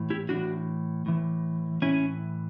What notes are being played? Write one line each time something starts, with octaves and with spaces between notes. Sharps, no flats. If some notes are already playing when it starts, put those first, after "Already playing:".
Already playing: A2 E3
E4 G4
A2 E3 D4 F#4
A2 E3
A2 E3 C#4 E4